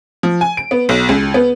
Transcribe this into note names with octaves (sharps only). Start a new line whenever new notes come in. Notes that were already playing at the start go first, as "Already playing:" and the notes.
F3
G#5
D7
B3
B1
C#2
B3